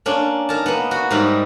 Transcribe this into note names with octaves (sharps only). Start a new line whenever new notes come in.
A#3 C#4 D4
D#4 A#4 A5
A#3 B3
F#4
G#2 G3 D#4 E4 A#4 B5